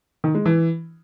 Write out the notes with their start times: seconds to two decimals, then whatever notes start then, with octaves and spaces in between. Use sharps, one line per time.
0.24 D#3
0.35 G#3
0.46 E3